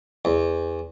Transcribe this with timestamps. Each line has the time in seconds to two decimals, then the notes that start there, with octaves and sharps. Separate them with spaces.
0.25 E2